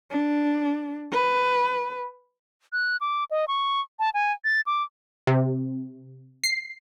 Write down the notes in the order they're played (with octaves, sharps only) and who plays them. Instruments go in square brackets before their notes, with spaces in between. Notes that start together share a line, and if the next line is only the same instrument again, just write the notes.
[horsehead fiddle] D4
B4
[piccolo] F#6
D6
D#5
C#6
A5
G#5
A6
D6
[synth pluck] C3
C7